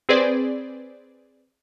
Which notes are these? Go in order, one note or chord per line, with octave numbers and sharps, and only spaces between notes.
C4 G#4 B4 C5 D5